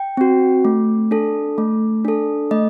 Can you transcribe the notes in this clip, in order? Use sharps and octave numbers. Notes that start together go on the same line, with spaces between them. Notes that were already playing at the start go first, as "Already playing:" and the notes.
Already playing: G5
C4 F#4
A3
D4 A4
A3
D4 A4
A3 D#5